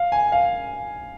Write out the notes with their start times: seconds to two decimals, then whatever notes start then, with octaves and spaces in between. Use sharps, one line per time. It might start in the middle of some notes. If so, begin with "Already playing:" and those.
Already playing: F5
0.12 G#5
0.32 F5